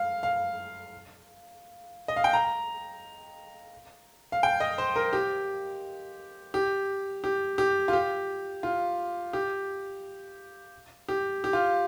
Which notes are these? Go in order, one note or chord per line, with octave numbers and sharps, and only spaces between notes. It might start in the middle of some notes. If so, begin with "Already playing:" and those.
Already playing: F5
F5
D#5
F5
G5
A#5
F5
G5
D#5
C5
A#4
G4
G4
G4
G4
F4
G4
F4
G4
G4
G4
F4